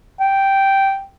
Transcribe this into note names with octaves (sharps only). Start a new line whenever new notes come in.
G5